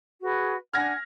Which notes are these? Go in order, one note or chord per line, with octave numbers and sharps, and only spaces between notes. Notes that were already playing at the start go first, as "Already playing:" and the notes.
F#4 G#4 B4
D4 F#5 G#5 F6 G#6 A#6